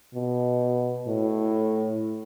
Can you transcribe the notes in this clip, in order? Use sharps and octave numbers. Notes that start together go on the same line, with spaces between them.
B2
A2